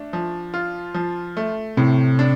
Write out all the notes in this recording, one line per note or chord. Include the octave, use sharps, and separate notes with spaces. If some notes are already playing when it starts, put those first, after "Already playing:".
Already playing: A3 D4
F3
F4
F3
A3
A2 C3
D4